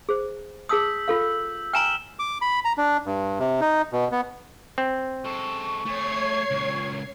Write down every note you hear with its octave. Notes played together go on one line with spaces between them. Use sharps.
G#4 C5
G#4 A5 D#6 E6 G6 B6
F4 A4 F5
G5 G#5 A#5 F6 E7 F#7
D6
B5
A#5
D4
G2
C3
D#4
B2
B3
C4
G#3 A4 C#6
A3 G#4 C#5 G#6 C7
C#2 A#2